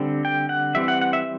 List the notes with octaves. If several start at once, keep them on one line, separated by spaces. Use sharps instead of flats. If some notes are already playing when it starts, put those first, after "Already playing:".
Already playing: D3 G3 C4 A4
G5
F#5
E3 G3 C4 E5
F#5
F#5
E5